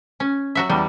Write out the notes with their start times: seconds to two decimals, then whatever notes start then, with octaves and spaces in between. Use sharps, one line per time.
0.20 C#4
0.55 F#3 F#4 E5
0.70 E2 G3